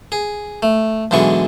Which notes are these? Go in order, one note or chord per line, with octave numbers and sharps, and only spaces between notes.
G#4
A3
B1 D3 E3 G#3 C#6